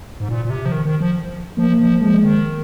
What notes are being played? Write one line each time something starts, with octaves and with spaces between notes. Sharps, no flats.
G#2
A#2
A#2
C3
F3
D#3
D#3
F3
F3 A#3
F3
F3 G#3
D#3